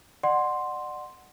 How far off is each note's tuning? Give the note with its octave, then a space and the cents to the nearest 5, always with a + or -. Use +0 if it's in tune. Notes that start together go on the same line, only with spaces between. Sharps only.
D5 +35 F#5 +0 C6 +0